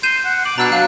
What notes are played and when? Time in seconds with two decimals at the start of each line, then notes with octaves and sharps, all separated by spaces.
0.03 C6 G6 D#7 E7
0.25 F#5
0.45 D6 F#7
0.58 B2 D4 A#5 E6 F#6
0.72 F#3 F5